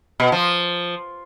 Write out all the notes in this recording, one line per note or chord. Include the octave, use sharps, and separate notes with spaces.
B2
F3